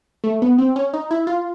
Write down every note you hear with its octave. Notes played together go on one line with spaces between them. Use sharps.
A3
B3
C4
C#4
D#4
E4
F4